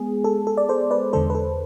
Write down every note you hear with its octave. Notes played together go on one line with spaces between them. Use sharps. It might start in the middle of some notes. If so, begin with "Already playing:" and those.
Already playing: G#3 B3 G#4
A4
A4
D5
A4 C5
B4 D5
E2 D3 G#3 A4 C5
B4
A4